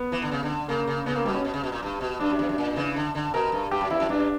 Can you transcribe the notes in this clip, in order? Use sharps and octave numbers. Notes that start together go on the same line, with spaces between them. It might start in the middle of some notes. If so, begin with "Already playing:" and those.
Already playing: B3
E3
D3
C#3
D3
C#3 A#3
C#3
C#3 B3
A#3
B2 G3
C#4
B2
C#3
B2
A#2
G2
B2
G2 D4
F#2
E2
F#2
A#2
C#3 E3
D3
D3
B2 A#4
G2
G2 G4
F#2
E2 E4
F#2
G2 D4